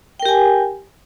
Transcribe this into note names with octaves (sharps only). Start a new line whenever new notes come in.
G4 A#4 G5 G#5